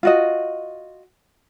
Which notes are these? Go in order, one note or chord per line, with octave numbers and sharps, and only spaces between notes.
F4 F#4 D#5